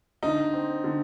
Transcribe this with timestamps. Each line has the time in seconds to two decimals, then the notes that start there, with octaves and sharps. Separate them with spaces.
0.23 D3 D#4
0.53 C4
0.84 D3